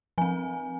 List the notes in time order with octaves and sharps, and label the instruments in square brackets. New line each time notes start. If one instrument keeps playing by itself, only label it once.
[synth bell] F3 C4 G#5